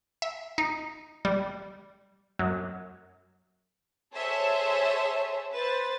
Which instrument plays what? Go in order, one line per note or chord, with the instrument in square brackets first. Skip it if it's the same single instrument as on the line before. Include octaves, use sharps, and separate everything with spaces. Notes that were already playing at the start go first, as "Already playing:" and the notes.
[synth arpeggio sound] E5
D#4
G3
F#2
[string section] G#4 A4 C5 C#5 E5
B4 C5 A6